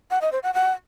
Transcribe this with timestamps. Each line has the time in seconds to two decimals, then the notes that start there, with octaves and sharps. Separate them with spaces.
0.11 F#5
0.21 D#5
0.32 C5
0.43 F#5
0.54 F#5